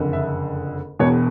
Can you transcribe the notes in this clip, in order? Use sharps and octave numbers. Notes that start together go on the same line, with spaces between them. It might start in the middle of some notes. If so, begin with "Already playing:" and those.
Already playing: F#1 F2 D3
E5
E1 E2 B2 C#5